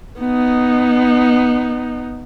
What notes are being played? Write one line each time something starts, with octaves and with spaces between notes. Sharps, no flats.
B3 D#4